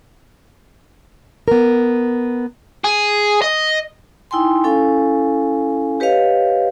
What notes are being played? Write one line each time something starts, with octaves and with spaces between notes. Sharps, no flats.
B3 A#4
G#4
D#5
D#4 E4 G5 G#5 C6
C#4 E4 A4 F5 G#5
G4 B4 C#5 D#5 F5